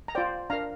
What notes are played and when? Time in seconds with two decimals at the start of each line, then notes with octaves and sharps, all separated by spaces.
0.08 A#5
0.15 F4 C5 D5 G5
0.50 D4 F5 A#5
0.53 A#4